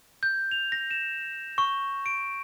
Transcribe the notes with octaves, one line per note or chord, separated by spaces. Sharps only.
G6
F7
A#6
E7
C#6
D7